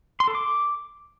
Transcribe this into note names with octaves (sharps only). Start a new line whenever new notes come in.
C6
A4
D6